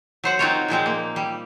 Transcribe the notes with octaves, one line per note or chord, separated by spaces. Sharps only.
F#3 C5 F#5
C4 D#4 F4 F#4 A#4 C#5
A#2 F3 G#3 C4
A#3
G3